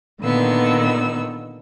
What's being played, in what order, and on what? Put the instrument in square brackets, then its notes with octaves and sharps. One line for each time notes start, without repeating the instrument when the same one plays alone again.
[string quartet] A#2 D3 D#3 B3 E6